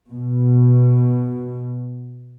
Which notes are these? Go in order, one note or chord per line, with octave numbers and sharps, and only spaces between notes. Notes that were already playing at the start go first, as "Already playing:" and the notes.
B2